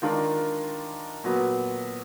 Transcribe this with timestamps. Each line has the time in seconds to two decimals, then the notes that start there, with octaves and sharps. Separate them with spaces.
0.02 D#3 G#3 D4 F4 A#4
1.24 A#2 F#3 B3